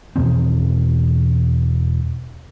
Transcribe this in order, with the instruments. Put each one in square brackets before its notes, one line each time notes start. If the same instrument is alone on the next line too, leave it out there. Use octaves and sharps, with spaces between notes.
[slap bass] E2 B2 D#3 C4